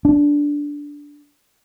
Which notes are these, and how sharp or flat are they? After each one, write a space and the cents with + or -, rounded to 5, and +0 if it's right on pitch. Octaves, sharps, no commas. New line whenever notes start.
D4 -10